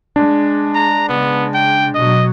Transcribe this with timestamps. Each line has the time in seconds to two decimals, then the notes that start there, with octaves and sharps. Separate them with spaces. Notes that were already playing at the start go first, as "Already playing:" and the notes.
0.16 G#3 D4
0.75 A#5
1.09 C#3 G#3 B3
1.55 G5
1.95 B2 F#3 D#5